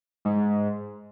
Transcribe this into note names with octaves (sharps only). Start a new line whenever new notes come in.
G#2